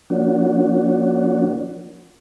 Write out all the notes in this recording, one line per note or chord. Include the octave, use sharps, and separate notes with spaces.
F3 A#3 C#4 D4 F#4